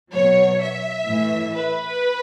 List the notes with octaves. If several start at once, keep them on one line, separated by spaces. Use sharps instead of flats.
B2 F#3 C#5
E5
A2 E3
B4